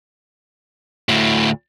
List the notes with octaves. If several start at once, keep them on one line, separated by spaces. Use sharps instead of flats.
D2 A2